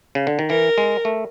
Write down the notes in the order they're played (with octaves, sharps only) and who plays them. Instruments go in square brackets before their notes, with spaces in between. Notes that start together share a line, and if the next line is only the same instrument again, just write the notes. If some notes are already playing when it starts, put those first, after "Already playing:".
[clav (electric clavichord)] C#3
D3
D#3
[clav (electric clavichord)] E3 [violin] A#4
[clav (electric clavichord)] G#3
A3